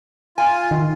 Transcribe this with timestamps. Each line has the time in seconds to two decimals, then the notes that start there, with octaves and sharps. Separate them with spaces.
0.38 F4 G#5
0.71 D#3